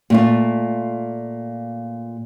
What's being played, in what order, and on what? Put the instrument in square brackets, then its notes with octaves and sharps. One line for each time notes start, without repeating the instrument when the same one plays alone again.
[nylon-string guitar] A#2 A3 F4